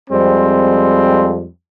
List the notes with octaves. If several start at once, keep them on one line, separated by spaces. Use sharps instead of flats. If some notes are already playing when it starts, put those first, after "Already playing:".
F2 G3 G#3 C4